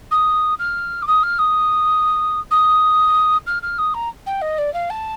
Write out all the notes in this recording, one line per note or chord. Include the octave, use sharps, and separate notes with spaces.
D#6
F6
D6
D#6
F6
D#6
D#6
F6
F6
D#6
A#5
G5
D#5
D5
F5
A5